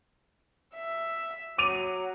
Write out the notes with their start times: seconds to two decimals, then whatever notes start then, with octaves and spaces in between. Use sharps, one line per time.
0.74 E5
1.58 F#3 D6 D#7 F7